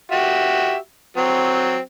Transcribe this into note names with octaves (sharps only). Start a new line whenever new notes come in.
F#4 G4 E5
F#3 C4